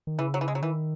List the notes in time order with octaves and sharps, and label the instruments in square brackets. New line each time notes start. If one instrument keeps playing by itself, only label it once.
[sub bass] D#3
[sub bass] C#3 [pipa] E3
[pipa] F#3
E3
G#3
F#3
[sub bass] D#3 [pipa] E3